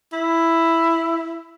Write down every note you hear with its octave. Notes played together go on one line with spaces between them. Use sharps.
E4